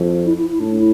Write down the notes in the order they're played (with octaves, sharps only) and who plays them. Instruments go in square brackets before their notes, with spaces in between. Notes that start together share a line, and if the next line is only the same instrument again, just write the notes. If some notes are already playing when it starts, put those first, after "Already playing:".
Already playing: [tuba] F2
[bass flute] E4
E4
E4
[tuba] A2 [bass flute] D4
[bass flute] E4